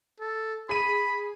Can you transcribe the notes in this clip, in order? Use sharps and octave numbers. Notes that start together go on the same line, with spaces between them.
A4
G#4 B5 D#7